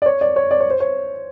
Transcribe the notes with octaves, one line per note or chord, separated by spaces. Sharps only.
D5
C#5
D5
C#5
D5
C#5
C5
C#5